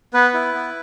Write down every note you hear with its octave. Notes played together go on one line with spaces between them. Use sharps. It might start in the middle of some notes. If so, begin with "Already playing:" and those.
B3 B4
E4
B3